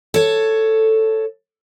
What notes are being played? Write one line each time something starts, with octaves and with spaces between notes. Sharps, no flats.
A4 C#5